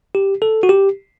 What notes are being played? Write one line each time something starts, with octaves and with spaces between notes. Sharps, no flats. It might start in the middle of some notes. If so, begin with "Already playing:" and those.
G4
A4
F#4
G4